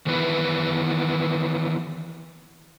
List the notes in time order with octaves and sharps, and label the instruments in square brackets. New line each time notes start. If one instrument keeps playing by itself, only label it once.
[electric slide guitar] D#3 E3 B3 B4